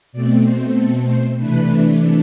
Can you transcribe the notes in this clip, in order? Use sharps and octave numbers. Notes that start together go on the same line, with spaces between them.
B2 A3 C4 D5
C5
A4
C5
C3 E3 A3 D4 B4